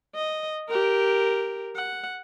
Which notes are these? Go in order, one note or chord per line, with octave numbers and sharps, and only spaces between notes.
D#5
G4 A#4
F#5